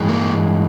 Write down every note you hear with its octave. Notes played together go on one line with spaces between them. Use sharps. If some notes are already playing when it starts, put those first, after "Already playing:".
Already playing: G2 E3 G#3
A#3